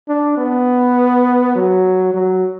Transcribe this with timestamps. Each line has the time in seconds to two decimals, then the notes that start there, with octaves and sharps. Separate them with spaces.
0.09 D4
0.38 B3
1.55 F#3
2.14 F#3